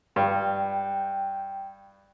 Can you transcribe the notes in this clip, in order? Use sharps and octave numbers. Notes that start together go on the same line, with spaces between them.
G2 G5